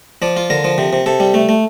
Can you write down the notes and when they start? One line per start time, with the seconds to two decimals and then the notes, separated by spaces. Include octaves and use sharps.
0.22 F3 D5
0.37 F4
0.50 D3 A#4
0.64 F3
0.78 C3
0.93 C3
1.06 C3 A4
1.20 G3
1.34 A3
1.49 A3